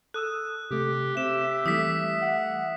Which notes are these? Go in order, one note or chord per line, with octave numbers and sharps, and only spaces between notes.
A4 D#6 E6 F#6
C3 A3 G4
C4 G4 E5 E7
E3 G3 A3 D#6 B6
F#5